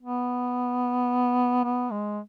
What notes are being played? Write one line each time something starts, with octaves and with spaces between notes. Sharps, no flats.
B3
B3
G#3